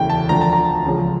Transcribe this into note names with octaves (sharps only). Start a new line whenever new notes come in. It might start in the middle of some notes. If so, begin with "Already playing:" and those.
Already playing: E1 D2 C#3 E3 G5
A5
D2 D3 F3 A#5
A5
A#5
C#2 C#3 F3